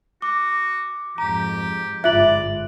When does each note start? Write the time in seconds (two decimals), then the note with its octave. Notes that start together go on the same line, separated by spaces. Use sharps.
0.22 F#4 D6
1.18 F2 G#2 G4 A#5
2.04 G1 G#2 F4 D5 E5 F#6 F#7